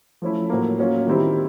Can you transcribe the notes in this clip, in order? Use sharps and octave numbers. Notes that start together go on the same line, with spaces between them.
F3 A3 C#4 E4
A2 F#3 A#3
F#3 A#3 C#4 F4
D#3 G3 C4 E4 G4